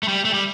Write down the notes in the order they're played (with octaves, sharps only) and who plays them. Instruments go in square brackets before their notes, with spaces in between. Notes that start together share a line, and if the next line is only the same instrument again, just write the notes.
[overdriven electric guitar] A3
G3
A3
G3